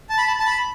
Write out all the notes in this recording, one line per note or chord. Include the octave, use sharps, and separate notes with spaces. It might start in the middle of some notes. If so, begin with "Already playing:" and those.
A5
B5
A5
A5
B5